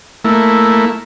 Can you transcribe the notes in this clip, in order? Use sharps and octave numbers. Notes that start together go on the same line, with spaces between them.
A3 A#3 E4